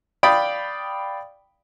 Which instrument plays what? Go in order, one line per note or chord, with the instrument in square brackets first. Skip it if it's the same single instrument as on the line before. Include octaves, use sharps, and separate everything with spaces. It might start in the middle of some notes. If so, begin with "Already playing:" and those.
[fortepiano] D5 F5 G5 B5 D#6